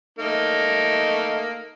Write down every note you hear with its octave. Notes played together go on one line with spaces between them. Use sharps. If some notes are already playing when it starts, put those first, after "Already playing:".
A3 A#3 D#4